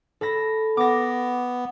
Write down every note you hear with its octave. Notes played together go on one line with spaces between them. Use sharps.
A4 B5 A#6
B3 D6 A#6